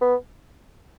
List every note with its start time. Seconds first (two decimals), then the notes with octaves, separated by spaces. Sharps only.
0.01 B3